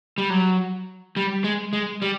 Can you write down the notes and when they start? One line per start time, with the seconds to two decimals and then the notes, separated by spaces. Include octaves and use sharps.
0.18 G3
0.30 F#3
1.16 G3
1.44 G#3
1.73 G#3
2.02 G3